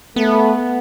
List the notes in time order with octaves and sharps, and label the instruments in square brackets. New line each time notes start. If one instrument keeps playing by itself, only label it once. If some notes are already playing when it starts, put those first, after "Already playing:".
[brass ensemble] A3 [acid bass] B3